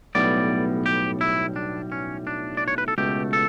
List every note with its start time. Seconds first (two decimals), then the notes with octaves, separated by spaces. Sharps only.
0.15 B1 A2 G3 B3 D5
0.86 G4
1.21 E4
1.56 D4
1.92 C#4
2.27 D4
2.57 D5
2.68 C#5
2.78 B4
2.88 A4
2.98 C#2 B2 A3 G4
3.33 A4